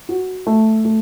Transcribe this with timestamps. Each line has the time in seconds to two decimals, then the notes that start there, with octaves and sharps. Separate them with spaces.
0.09 F#4
0.47 A3
0.85 A3